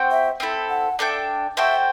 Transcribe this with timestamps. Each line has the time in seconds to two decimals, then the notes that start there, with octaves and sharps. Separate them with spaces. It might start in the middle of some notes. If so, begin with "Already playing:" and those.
Already playing: C4 F#4 C5 G5
0.11 E5
0.40 C4 E4 A4
0.70 F#5
0.99 D4 A4 E5 G5
1.57 F#4 A4 C5 E5 G5